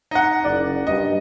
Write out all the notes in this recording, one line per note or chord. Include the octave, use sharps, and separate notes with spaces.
D#4 F#5
F#1 D5
G2 D#5